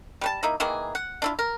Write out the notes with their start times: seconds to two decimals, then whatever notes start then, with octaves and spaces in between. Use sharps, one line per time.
0.21 G3 B4 A5
0.43 A#3 D#4 E4
0.60 D#3 E3 A#3 G#4
0.95 F#5
1.22 D4 E4 F4
1.39 A#4